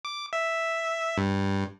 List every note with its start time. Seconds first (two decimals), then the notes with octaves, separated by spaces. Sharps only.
0.05 D6
0.33 E5
1.18 G2